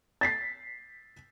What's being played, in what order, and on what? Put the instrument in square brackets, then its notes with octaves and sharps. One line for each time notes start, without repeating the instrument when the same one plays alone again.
[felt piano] A6 B6 C7